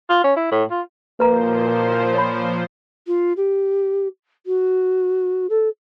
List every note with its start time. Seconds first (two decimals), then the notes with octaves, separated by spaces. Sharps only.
0.09 F4
0.24 C#4
0.36 E4
0.51 A2
0.71 F4
1.20 A#2 F3 A#3 B4 C5 A#5
2.14 C#5 B5
3.07 F4
3.37 G4
4.46 F#4
5.50 A4